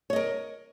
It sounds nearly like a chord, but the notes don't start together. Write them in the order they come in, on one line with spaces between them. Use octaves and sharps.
C#5 D#5 A#4